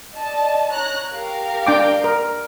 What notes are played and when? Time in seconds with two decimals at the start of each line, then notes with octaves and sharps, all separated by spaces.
0.15 D5 D#5 A5
0.71 C#5 A#5 F#6
1.12 G4 A#4 F5
1.66 D4 G5 D6
2.04 A#4